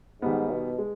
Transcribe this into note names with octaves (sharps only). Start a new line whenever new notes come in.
G#2 D#3 G3 B3
B2
G#3